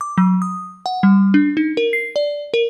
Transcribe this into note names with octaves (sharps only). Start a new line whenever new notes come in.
D6
F#3
D#6
F#5
G3
D4
D#4
A#4
C7
D5
A#4